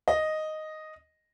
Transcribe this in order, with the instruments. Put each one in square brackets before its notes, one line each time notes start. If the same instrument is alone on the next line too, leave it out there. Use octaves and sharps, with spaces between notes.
[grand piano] D#5